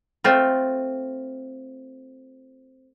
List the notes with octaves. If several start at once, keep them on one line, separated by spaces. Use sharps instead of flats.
A3 C4 F4